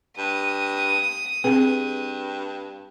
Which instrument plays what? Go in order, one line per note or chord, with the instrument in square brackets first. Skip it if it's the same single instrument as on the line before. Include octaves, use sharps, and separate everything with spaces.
[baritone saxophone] G2 [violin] D#6
[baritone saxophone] G2 [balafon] C4 G#4 B4